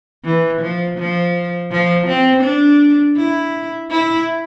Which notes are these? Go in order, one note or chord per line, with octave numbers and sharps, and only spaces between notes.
E3
F3
F3
F3
C4
D4
E4
E4